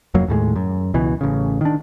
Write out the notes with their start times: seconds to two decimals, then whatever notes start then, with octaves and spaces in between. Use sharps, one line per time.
0.14 F1 F2 F#3 A#3
0.28 D#2 A2 G3 G#3
0.56 F#2
0.94 C#2 B2 E3
1.21 A1 C#3
1.61 D#3 D4